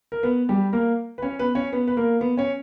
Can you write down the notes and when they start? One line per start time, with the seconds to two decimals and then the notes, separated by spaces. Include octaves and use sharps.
0.12 A#4
0.23 B3 B4
0.49 G3 G4
0.73 A#3 A#4
1.18 B4
1.22 C#4 C#5
1.39 B3 B4
1.55 C#4 C#5
1.72 B3 B4
1.88 B4
1.97 A#3 A#4
2.21 B3 B4
2.37 C#4 C#5